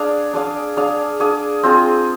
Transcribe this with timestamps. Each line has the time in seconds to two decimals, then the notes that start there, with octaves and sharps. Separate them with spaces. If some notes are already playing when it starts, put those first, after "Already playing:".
Already playing: D4 G#4 D5 F5
0.33 D4 G#4 D5 F5
0.77 D4 G#4 D5 F5
1.20 D4 G#4 D5 F5
1.63 C4 F4 G#4